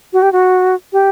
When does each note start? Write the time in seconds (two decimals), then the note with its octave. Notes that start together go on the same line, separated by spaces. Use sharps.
0.13 F#4
0.23 G4
0.32 F#4
0.93 G4